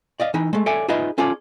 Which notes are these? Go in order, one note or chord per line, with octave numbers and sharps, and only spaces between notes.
D5 D#5 F5
E3 D#4 B5
G#3 A3
A4 C#5 D5 E5 G#5
D#4 F4 G#4 B4 D#5 E5
C#4 F4 G#4 A4 C#5 D5